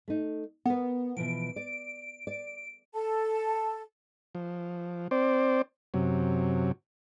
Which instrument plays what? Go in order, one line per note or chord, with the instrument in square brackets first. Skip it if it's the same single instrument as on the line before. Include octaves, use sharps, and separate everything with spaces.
[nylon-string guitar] A3 D#4
[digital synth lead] B3 [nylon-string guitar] A#4 B4
[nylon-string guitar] B2 E3 F3 [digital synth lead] D7
[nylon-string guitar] D5
D5
[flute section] A4 A5
[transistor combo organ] F3
C4 C5 D5
F#2 C3 F#3